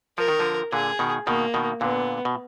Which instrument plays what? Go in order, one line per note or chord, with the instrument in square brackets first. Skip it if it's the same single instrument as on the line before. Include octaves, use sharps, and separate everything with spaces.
[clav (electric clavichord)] F3 [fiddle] A#4
[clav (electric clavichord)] D#3
D3 F3
[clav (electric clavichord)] A#2 D3 [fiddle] G#4
[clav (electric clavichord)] B2 D#3
[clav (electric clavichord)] B2 D#3 [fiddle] A#3
[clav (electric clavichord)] B2 D#3
[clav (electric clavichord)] A#2 D3 [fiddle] B3
[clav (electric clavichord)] B2